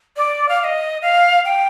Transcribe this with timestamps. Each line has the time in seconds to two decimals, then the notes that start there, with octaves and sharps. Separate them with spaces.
0.17 D5
0.49 F5
0.59 F5
0.64 D#5
1.02 F5
1.45 G5